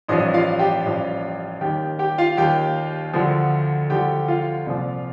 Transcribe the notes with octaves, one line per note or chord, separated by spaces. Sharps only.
A1 G2 F3 D#4 D#5
F4 F5
G4 G5
A1 G2 F3
D#2 D#3 G4 G5
G4 G5
F4 F5
D#2 D#3 G4 G5
D2 D3 F3
D2 D3 F3 G4 G5
F4 F5
C2 A#2 F3